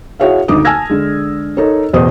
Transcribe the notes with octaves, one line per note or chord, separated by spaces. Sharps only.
E4 F#4 G#4 C#5 E5 F5
G#1 D2 D#4 D6 D#6
G#5 A5 E6 F6 G#6 A#6
D3 G#3
D#4 A4 A#4 C#5 D#5
A1 E2 B2 C5 D#6